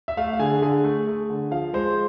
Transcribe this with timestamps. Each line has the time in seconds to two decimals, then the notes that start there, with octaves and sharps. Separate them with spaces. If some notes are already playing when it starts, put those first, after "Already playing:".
0.08 E5
0.17 A3 F5
0.33 F5
0.39 D3 G#4 G#5
0.62 D3 G#4 G#5
0.84 A3
1.07 A3
1.30 D3
1.51 F3 F5
1.73 G#3 C5 C6